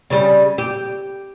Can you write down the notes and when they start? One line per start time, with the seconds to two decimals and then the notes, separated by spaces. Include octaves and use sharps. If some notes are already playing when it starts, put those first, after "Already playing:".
0.10 C#3 G3
0.58 G4